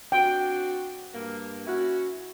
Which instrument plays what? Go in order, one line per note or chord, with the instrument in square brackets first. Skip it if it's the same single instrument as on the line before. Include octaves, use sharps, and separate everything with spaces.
[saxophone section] C4 D4 F#4 [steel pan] G5
[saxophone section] G2 A#3
C#4 E4 F#4